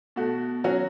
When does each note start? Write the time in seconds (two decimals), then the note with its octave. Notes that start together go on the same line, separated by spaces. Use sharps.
0.16 B2 A3 F#4
0.64 F#3 C#4 F#4